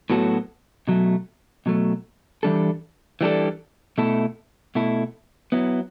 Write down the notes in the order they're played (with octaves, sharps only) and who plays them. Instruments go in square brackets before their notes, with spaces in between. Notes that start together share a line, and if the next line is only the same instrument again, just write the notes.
[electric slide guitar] A2 F#3 B3 F#4 A4
B2 F#3 A3
B2 F#3 A3
E3 G3 D4 A4
E3 G3 D4 A4
B2 A3 E4 A4
B2 A3 E4 A4
F#3 B3 E4